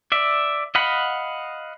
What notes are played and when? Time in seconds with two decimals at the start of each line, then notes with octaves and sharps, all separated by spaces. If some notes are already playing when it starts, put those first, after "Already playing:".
0.12 D5 E5
0.75 D#5 F5 F#5 B5